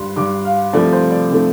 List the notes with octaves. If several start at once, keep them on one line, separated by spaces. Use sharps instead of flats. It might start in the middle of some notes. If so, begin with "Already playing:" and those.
Already playing: G2 G3 C6
G2 G3 D6
F5
C2 C3 F3 A3 D5
C5
D5
C3 F3 A3